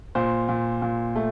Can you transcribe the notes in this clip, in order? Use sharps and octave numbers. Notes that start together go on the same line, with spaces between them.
A#2 C5
A#2
A#2
A3